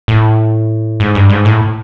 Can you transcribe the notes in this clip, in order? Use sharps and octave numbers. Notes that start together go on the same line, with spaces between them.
A2
G#2
G2
G#2
A2